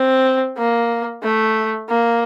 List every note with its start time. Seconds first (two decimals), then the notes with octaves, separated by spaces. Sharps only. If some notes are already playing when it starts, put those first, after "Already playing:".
Already playing: C4
0.58 A#3
1.23 A3
1.89 A#3